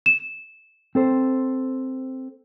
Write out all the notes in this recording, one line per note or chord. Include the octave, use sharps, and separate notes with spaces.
E7
C4 A4 C5